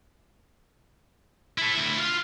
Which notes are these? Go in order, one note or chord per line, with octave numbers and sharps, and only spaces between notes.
E4 A4
D2 E4
F4 F5